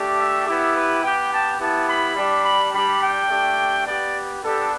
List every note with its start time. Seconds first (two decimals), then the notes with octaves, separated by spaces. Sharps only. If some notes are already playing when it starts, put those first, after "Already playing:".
Already playing: A3 D4 G4
0.18 E5
0.46 B3 E4 G4
0.75 B4
1.03 B3 G4 G5
1.32 A5
1.60 B3 E4 G4 A5
1.89 B5
2.16 G3 D4 G4
2.44 B5
2.73 G3 D4 G4 B5
3.01 G5
3.29 A3 D4 G4
3.86 B3 G4 D5
4.43 B3 D4 G4 A4